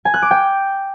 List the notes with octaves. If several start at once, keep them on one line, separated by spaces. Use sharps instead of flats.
G#5
F#6
D6
G5